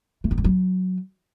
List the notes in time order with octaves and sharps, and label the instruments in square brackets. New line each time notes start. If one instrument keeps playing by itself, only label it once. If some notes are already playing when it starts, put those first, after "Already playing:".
[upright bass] A3
D#3
G3
F#3